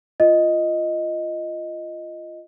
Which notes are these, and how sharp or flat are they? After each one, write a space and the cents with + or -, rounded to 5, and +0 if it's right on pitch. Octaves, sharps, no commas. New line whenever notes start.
F4 -15 D#5 +0